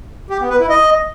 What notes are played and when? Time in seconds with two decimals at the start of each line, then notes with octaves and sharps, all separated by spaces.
0.30 G4
0.40 B3
0.50 B4
0.60 E4
0.69 D#5